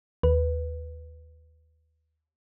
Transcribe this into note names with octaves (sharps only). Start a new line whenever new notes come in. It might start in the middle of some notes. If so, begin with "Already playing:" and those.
D#2 B4